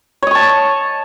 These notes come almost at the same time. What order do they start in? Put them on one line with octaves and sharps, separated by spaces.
C#5 D#5 C#6 A5